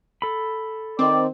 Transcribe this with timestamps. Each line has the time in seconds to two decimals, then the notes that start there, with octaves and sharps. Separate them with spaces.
0.22 A4 B5
0.99 D#3 C4 D5